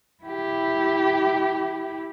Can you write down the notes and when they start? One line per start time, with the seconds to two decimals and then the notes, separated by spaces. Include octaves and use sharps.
0.24 E4 G4